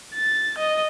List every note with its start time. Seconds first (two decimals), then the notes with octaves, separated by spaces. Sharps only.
0.15 A6
0.58 D#5